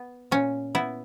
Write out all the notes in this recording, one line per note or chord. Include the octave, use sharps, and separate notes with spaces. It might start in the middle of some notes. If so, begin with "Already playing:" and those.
Already playing: B3
A#2 C#4
B3 E4